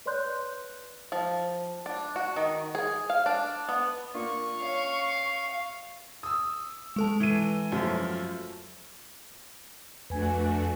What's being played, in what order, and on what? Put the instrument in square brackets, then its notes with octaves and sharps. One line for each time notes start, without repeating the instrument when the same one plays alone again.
[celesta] B4 C#5 D5 C6 F#6 G6
[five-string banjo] F3
D4
F#4
D#3
G#4
F5
D4
B3
[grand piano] A#3 D4 F4 [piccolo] C#6
[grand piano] C#4 [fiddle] F5
[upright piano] D#6 E6
[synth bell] G#3 A4 A5
[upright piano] E3 D#7
F#2 F3 A3
[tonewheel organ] F2 [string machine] A3 D4 F#4 [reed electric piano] B4 G#5